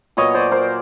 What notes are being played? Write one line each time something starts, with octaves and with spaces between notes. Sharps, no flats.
A#2 F#3 B3 C#5 D#5
C5 D5
A#4 C5